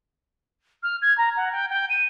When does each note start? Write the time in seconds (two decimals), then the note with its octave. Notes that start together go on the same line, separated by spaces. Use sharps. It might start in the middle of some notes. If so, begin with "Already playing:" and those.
0.83 F6
1.01 G#6
1.17 A#5
1.36 F#5
1.52 G5
1.69 G5
1.89 D#7